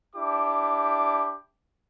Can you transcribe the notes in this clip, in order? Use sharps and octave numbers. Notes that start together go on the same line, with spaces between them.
D4 E4 G4 D6